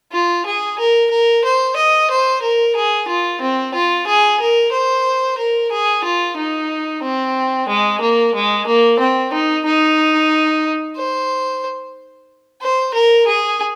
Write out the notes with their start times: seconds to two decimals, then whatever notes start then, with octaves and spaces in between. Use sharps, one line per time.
0.12 F4
0.46 G#4
0.79 A#4
1.11 A#4
1.44 C5
1.76 D#5
2.10 C5
2.42 A#4
2.76 G#4
3.08 F4
3.41 C4
3.74 F4
4.07 G#4
4.40 A#4
4.72 C5
5.39 A#4
5.71 G#4
6.04 F4
6.36 D#4
7.03 C4
7.68 G#3
8.01 A#3
8.35 G#3
8.66 A#3
8.99 C4
9.33 D#4
9.65 D#4
10.97 C5
12.62 C5
12.94 A#4
13.27 G#4